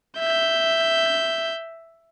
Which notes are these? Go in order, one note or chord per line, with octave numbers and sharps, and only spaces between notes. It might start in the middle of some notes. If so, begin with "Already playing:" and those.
E5 G6